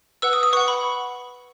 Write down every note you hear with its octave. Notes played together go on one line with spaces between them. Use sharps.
B4 F#5 E6
D#6
D#6
B4 F#5 C#6
B5